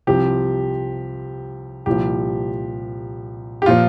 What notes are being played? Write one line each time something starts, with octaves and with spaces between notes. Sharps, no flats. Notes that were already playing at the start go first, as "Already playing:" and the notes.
C2 C3 F3 G4
C2 A#2 F3 G4
G4
A#2 F3 F4